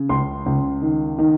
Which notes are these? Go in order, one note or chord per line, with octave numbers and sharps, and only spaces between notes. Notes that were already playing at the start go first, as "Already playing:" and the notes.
Already playing: C#3
C#2 C6
C#2
D#3
D#3